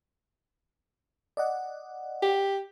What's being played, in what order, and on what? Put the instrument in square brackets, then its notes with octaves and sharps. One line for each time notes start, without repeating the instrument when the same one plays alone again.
[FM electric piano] D5 D#5 F#5
[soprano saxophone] G4